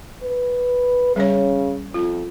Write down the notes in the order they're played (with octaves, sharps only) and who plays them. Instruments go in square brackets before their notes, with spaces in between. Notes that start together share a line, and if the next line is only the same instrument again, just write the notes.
[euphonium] B4
[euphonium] C#3 [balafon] G3 C#4 C#5
[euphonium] F2 [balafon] F4